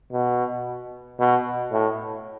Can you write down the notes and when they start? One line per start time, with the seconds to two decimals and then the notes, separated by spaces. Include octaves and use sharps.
0.12 B2
1.19 B2
1.72 A2